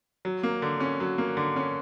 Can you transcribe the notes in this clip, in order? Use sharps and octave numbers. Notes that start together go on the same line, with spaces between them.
F#3
A#3
D3
C#4
F#3
A#3
D3
C#4